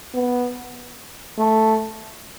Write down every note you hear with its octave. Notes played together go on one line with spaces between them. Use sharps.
B3
A3